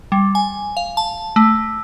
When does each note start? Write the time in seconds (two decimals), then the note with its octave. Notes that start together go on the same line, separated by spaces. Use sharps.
0.12 G3
0.35 G#5
0.77 F5
0.97 A5
1.36 A3